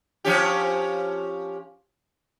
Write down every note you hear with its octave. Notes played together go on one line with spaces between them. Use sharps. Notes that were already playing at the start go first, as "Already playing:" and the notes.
F3 C#4 G4